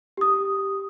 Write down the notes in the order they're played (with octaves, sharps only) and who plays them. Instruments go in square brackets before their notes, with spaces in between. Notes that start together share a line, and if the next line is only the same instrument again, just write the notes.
[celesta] G4 D#6